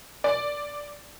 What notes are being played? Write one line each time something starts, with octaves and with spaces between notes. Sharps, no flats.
D5